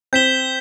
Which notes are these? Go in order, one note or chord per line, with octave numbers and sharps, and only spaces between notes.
C4 G6 B6 E7 G7